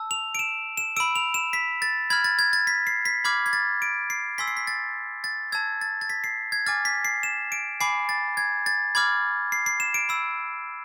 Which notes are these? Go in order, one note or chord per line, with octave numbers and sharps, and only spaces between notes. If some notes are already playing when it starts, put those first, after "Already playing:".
Already playing: A5 E6
F7
D7
E7
E7
B5 E6 D7
F7
E7
B6
A6
B5 F6 G#6
A6
G#6
A6
B6
C7
B6
B5 D6 F6 G#6
G#6
A6
D7
C7
G#5 C6 E6 B6
C7
B6
A6
A6
A5 E6 G#6
A6
A6
B6
C7
G#6
G#5 D6 F6 A6
B6
C7
E7
D7
G#5 B5 D6 C7
A6
G#6
A6
B5 D6 F6 G#6
C7
C7
E7
D7
B5 E6